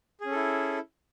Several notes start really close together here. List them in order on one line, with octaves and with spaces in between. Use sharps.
G#4 C#4 A4 E4